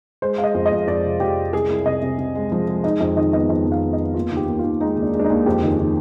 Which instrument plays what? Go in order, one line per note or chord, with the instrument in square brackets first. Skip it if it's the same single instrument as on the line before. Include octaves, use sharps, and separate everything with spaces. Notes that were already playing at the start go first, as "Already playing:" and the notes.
[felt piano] G#3 [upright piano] C5
[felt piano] G#3 [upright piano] F5
[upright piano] D#5
[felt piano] F2
[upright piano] D#5
[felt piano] F2
[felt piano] F2 [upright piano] D5
[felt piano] C3
[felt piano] F2 [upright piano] G4
[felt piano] G#3
[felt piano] C2 [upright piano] G#4
[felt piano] C2
[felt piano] C3 [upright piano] D#5
[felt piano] C3
C3
G#3
F3
G#3
[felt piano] D#4 [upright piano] D#5
[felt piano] F2 [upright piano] D#5
[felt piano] D#3 [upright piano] D#5
[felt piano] B3 [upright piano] D#5
[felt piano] F2 [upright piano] D#5
[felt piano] F2
[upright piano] F5
[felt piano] B3
[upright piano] D#5
[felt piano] B3
[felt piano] D#2 [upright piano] F4
[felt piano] D#3
[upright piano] G4
[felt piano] D#2
[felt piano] D#2 [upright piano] F4
[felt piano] G#3 [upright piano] D#4
[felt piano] D#2
[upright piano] D4
[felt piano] G#3
[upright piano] D4
D#4
[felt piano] D#2
[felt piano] F2 [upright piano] G4
[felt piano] D#3
[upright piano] G#4
[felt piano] D#3